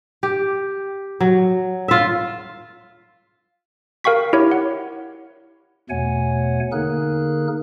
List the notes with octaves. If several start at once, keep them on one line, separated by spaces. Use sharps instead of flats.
G4
F#3
F4 E5
A#4 F5 G5 C#6 B6
E4 G4 C#5
F#5
E2 B2 A3 C#5 F#5 G#5
D3 A#3 D#4 G#4 A#4 F#6